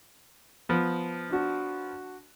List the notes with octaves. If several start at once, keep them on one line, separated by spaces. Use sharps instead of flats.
F3 B3
D4 F#4